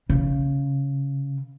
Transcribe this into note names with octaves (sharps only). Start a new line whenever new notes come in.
C#3